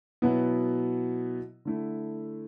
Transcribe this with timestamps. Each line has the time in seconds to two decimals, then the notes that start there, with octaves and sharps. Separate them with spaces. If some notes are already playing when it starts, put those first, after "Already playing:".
0.22 B2 F#3 B3 E4
1.65 D3 A3 E4